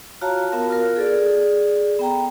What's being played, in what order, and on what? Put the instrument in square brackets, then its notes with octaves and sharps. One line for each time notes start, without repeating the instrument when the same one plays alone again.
[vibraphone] F4 F#4 C#5 F5 A5 A#5
B3 F4 F#4 A#4 F5
F4 A#4 F5
G#4 A4 D5
B3 G5 A#5